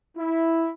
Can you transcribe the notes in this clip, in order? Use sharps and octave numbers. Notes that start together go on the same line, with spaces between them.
E4